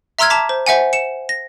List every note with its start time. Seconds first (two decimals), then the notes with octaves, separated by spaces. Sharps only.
0.19 E5 A#5 C6 E6 F6 G#6
0.30 A5 A#5 D6 B6
0.49 C5
0.66 C5 E5 F#5 G#5
0.93 C#7 E7
1.29 A#6